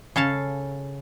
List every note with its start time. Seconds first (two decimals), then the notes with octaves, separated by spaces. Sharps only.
0.16 C#3 A4 F5 A5